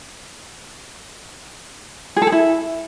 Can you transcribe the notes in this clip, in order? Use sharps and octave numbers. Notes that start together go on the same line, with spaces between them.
G#4
A4
G#4
E4